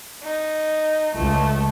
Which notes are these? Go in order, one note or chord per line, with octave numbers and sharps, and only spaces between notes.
D#4
C#2 A3